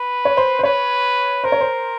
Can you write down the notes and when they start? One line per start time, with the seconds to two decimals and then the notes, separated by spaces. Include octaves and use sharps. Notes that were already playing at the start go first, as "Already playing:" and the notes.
Already playing: B4
0.25 C#5
0.37 C5
0.59 C5
0.63 B4 C#5
1.44 A#4 C5
1.52 C#5
1.61 C5